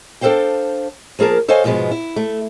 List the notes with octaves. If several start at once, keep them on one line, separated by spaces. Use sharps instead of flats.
D4 A4 A#4 C5 F5 G5
F3 A#3 G#4 A#4 A5
A4 C5 C#5 D#5 F5 G#5
G#2 B2 F3 G#3 B3
E4
A3